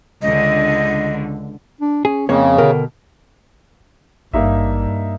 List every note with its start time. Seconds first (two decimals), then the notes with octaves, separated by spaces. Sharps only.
0.22 C#2 D3 D#5
1.81 D4
2.05 C#4 G#4
2.29 F2 C#3 A#3 C4 C#5
2.58 B2 D3 A#4 G5
4.33 G#1 G2 A#3 D#4 E5